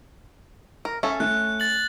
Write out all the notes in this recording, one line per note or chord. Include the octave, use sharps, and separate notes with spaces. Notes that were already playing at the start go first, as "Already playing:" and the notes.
A#4
C#4 A4 E5
A3 F#6
A6 F#7